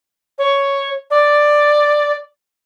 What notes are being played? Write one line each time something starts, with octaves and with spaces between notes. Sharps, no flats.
C#5
D5